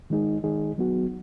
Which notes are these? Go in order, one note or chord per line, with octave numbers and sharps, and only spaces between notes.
D#3 G#3 D#4 G#4
D#3 G#3 D#4 G#4
F#3 B3 F#4